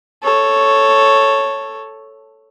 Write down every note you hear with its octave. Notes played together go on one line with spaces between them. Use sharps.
A4 C#5